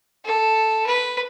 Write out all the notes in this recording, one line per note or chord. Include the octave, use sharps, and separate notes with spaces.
A4
B4